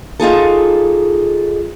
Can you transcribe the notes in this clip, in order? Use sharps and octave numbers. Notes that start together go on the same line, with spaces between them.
D#4 F4 G#4 A4